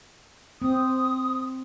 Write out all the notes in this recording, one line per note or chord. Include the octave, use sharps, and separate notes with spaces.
C4 D#6